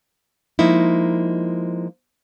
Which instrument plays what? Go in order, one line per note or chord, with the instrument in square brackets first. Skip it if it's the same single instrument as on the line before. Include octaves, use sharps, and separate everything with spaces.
[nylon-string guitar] F3 G#3 A#3 D#4 E4